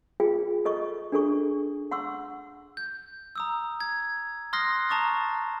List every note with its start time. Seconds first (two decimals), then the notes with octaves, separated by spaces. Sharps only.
0.20 F4 G#4 G5
0.65 A4 D#5 C#6
1.12 D4 G#4 A4 C#6
1.91 F#5 C6 C#6 E6
2.77 G6
3.36 A#5 D#6 E6
3.81 G#6
4.53 C6 D#6 F6 F#6 A#6 C7
4.89 A5 A#5 C#6 D#6 A6